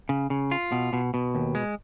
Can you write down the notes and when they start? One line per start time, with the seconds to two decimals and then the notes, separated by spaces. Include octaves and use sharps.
0.09 C#3
0.30 C#3
0.51 F4
0.72 B2
0.93 B2
1.14 B2
1.35 D#2
1.55 G#3